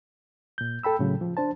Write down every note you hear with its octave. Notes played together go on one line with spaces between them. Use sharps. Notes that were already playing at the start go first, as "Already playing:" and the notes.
A#2 G6
A4 G5 B5 E6
A2 C#3 F#3
F3
D4 C5 A5